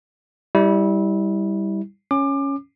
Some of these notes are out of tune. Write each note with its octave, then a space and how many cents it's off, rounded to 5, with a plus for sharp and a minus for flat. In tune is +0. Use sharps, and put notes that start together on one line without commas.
G3 +0 E4 -25
C#4 +0 D6 +25